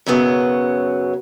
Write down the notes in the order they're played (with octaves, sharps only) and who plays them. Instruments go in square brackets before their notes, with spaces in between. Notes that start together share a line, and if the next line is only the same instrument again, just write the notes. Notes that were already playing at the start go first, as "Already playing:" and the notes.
[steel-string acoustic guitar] F#2 C#3 F#3 B3